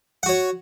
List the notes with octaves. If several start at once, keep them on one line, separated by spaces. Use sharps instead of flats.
F#4 C#5 F#5